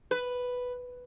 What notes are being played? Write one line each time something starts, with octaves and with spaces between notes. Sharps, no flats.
B4